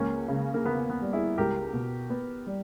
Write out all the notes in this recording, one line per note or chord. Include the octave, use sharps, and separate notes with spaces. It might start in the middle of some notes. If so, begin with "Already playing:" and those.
Already playing: C#2 A#3 C#4
C#3
A#3
A#3 B3
B3
G3
E4 G#4
C#2 G4 A#4
B2
B3
G3